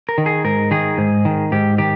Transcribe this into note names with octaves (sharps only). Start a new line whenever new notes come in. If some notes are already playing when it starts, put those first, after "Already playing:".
A#4
D#3
G#4
G#2 A#4
D#3 G#4
G#2
D#3
G#2 G4
D#3 G4